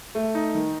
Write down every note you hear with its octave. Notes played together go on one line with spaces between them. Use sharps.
A3
D#4
D#3